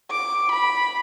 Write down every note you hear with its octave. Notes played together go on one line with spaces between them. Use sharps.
D6
B5